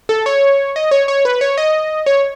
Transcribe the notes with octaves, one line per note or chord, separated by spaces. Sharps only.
A4
C#5
D#5
C#5
C#5
B4
C#5
D#5
C#5